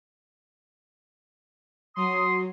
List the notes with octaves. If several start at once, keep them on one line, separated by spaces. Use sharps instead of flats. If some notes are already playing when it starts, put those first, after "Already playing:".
F#3 C6 D#6